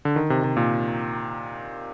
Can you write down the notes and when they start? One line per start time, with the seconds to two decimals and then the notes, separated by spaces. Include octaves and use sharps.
0.05 D3
0.16 D#3
0.30 C3
0.44 C3
0.57 A#2